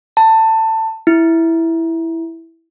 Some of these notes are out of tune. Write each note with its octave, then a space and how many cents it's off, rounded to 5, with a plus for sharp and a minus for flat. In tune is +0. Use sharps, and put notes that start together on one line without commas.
A5 +20
E4 -5